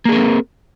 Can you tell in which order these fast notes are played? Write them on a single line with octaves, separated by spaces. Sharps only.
A#3 G#4 A#4 C4